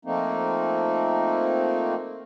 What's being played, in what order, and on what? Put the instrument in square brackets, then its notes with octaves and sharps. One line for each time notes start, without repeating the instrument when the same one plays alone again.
[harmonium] F3 A3 A#3 C4 D#4